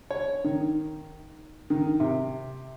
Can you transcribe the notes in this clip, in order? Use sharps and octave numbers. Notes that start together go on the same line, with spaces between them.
C#5
D#3
D#3
C3